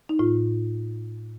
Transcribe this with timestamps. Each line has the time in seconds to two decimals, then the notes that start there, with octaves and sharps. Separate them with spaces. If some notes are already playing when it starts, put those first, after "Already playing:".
0.09 D#4
0.19 A2 F4